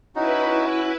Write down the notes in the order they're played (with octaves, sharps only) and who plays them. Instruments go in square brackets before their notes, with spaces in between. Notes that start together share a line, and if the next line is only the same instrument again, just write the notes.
[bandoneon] C#4 F#4 [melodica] D#4 [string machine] E4 B4